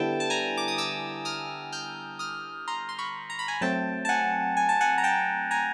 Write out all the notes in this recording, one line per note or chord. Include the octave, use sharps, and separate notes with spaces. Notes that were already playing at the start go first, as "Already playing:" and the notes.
Already playing: D3 G3 B3 E4 G5 A5
A5
G#5 A#5
D6
D#6
D6 E6
D#6 F6
F6 G6
D#6 F6
A#5 C6
C6
B5 C#6
A#5
B5
G#5 A#5
F#3 A3 C4 G5 A5
A5
F#5 G#5
G#5
A5
F#5 G#5
A#5
G5 A5
G#5 A#5